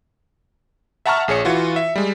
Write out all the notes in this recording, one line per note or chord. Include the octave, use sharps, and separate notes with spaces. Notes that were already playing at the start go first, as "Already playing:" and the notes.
E5 F#5 A5 A#5 C#6 F6
A#1 G#4 C#5 C#7
E3 F4 F#4
E5
G3 G#3